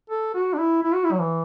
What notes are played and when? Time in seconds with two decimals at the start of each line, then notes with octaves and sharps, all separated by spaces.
0.10 A4
0.34 F#4
0.53 D4
0.59 E4
0.83 E4
0.94 F#4
1.04 E4
1.12 F#3
1.19 E3